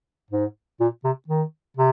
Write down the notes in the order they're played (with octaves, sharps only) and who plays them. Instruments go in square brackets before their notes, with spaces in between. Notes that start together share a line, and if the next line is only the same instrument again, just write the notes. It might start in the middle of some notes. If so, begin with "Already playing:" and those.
[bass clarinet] G#2
A#2
C3
D#3
C3